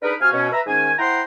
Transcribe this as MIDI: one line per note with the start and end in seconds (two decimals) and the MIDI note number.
0.02 0.14 62
0.02 0.14 63
0.02 0.14 68
0.02 0.14 70
0.02 0.14 71
0.21 0.29 48
0.21 0.29 66
0.21 0.29 77
0.21 0.29 80
0.21 0.29 89
0.32 0.48 47
0.32 0.48 61
0.52 0.61 71
0.52 0.61 76
0.52 0.61 82
0.66 0.92 44
0.66 0.92 51
0.66 0.92 61
0.66 0.92 80
0.98 1.21 64
0.98 1.21 72
0.98 1.21 78
0.98 1.21 79
0.98 1.21 82
0.98 1.21 84